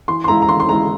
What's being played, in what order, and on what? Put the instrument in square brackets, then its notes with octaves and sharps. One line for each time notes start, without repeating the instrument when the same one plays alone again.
[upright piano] E3 C6
C6
G#3 E4 A#5
A#5
E3 C6
C6
G#3 E4 A#5